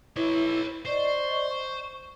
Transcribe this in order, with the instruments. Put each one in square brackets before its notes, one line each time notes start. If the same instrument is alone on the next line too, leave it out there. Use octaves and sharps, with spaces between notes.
[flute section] E4 [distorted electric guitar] B4 C#5
[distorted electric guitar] C5 [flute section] D5 D#5 C#6
[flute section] C#6